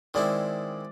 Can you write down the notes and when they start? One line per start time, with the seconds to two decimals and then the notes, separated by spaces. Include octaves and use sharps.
0.14 D#3 G#3 C4 E4 D5